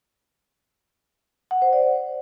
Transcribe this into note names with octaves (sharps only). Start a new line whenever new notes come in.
F#5
C5
D5